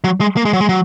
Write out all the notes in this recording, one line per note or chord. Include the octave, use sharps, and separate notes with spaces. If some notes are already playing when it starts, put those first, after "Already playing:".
F#3
G#3
A#3
G#3
F#3
G#3
F#3